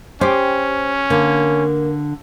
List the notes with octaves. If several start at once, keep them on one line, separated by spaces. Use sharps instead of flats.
C#4 G4 C5
D3 A#3